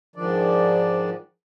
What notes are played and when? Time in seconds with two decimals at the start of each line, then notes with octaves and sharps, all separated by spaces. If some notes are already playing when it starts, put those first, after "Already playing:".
0.16 G#2 D#3 F3 D4 D5